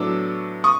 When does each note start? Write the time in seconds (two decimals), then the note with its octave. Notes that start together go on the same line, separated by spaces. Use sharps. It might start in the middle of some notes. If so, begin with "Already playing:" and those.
Already playing: A2 F#3 B3 D4 D6 E6
0.64 C#6 D#6